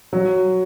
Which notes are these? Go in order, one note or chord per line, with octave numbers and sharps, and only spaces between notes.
F#3